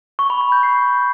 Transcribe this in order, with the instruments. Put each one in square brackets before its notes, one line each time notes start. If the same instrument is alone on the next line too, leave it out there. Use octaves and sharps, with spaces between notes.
[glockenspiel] C#6
B5
B5
G6
C7